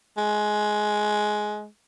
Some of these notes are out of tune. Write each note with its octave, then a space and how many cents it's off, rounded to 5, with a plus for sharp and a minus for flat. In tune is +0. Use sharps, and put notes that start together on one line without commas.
G#3 +15